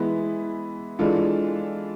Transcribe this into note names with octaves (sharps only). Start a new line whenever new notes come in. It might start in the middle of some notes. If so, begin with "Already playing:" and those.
Already playing: E3 G#3 B3 E4
E3 G#3 D4 F4 A4